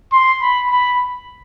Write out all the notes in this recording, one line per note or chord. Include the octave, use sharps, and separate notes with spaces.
C6
B5
B5